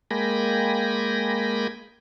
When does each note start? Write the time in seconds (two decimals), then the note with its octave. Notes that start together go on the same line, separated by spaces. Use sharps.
0.11 G#3 A#3 G5 G#5 B5 A#6